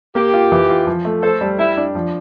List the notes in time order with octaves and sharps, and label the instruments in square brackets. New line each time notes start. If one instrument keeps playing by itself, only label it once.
[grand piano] A#3 [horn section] G4
[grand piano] F4
E3
F4
F3
A3
[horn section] A4 [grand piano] C5
[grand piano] G3
[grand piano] G3 [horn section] E4
[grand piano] D4
F3